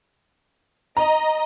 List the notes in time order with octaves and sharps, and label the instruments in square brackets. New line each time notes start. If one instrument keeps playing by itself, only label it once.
[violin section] D#5 [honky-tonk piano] A#5